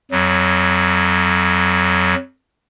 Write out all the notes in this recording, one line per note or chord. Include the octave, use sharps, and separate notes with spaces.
F2 F#3